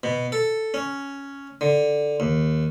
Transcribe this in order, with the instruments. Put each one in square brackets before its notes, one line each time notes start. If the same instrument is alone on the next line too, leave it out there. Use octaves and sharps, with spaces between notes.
[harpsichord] B2
A4
C#4
D3
D#2